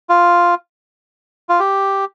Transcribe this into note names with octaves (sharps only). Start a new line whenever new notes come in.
F4
F4
G4